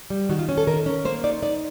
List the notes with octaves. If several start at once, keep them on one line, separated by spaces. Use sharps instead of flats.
G3
D#3 F#4
F4
C#4
A4
D#3 A#4
C#4
A#3 C5
D#4 D5
D#4 D5